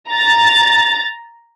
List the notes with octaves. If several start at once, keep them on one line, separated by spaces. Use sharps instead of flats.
A#5 A6